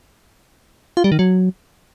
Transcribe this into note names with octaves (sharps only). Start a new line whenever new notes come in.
F4
G3
D#3
F#3